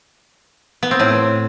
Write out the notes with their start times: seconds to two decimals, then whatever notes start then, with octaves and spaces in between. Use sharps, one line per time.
0.83 B3
0.91 C4
1.00 A2